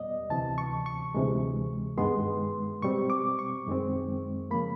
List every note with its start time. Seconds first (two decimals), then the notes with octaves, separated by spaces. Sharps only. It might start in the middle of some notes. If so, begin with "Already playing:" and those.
Already playing: E2 B2 G3 B3 D5 D#5
0.30 D2 C3 E3 A5
0.58 C#6
0.86 C#6
1.15 D2 C3 E3 G#3
1.98 G2 D#3 G#3 B3 C6
2.82 B2 G3 C4 C#6
3.10 D6
3.39 C#6
3.67 F#2 D#3 G#3 C4
4.51 C#3 F3 A#3 B5